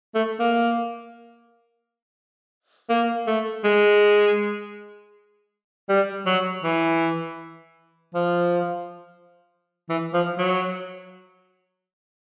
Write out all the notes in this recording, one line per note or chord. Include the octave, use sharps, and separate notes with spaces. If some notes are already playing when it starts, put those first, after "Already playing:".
A3
A#3
A#3
A3
G#3
G3
F#3
E3
F3
E3
F3
F#3